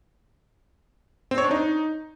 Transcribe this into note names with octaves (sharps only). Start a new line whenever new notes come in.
C4
C#5
D4
D#4